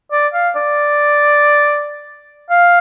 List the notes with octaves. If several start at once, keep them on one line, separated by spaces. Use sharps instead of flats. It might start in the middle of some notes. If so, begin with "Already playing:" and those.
D5
F5
D5
F5